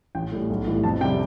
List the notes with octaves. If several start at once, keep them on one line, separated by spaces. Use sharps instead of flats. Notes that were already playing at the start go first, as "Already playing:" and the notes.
A1 G5
A2 G3
B1
A2 E3 G3
F2 A5
C3 G3 G5